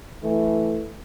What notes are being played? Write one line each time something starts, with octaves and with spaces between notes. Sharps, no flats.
E3 A3